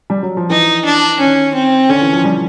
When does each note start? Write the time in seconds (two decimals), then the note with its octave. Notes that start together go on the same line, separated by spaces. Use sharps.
0.10 G3
0.23 F#3
0.37 F3
0.50 E3 D#4
0.85 D4
1.20 D#3 C#4
1.55 C4
1.89 D3 C#4
2.01 E3
2.13 F3
2.24 G3